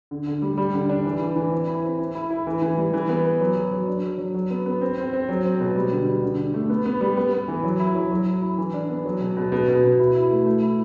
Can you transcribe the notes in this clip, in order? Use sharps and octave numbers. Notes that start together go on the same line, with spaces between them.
D3
D3
G3
G3
D3
D4
E3
E3
E3
C4
E4
C4
E4
E4
E4
E3
E3
G3
E3
B3
B3
F#3
F#3
F#3
D4
F#3
F#3
F#3
B3
B3
C4
C4
C4
F#3
C4
B2
G3
D3
G3
D3
D3
A3
B3
B3
G3
B3
B3
E3
F#3
E4
F#3
F#3
E4
E4
E3
D4
B3
F#3
B2
B2
B2
B2
B2
E4
E4
A3
A3
E4